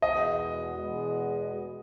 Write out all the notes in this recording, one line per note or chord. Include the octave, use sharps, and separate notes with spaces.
E2 B2 G#3 B3 D#5
E2 B2 G#3 B3